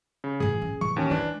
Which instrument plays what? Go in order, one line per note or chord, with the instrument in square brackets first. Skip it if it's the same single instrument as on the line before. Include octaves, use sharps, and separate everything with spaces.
[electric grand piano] C#3
[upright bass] A2 E3 [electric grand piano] G#4
[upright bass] C#4
[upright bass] A2 E3 [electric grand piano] C#6
[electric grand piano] D#2 C#4
[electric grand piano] E3 D4 [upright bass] G#3